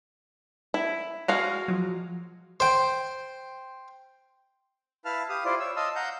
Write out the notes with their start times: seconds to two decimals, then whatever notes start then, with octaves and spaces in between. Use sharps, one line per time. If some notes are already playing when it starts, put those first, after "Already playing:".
0.74 E4
1.28 G#3 F#4 F5 F6
1.68 F3 F#3
2.60 C5 G5
5.05 E4 B4 F5 A5 F6
5.29 G4 F5 D#6
5.45 E4 F4 C5 D5
5.60 C#5 E6
5.76 D#5 F5 A5 C6 D#6 E6
5.96 F5 F#5 A#5 G6